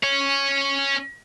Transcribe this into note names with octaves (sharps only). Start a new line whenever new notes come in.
C#4 C#5